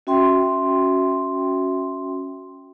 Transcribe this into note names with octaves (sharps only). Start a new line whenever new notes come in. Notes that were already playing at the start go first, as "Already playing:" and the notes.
C#4 F#4 E5 G5 C6